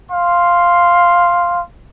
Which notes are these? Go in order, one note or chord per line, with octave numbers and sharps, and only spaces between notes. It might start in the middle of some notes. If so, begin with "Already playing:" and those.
F5 C6